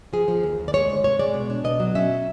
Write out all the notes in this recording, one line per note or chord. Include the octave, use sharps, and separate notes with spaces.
F3 G#4
F3
D#2
D#2
D5
G#3 C#5
D2
C3 C#5
G#3 D5
B2
D4
B2 D#5
F#3
C#4 E5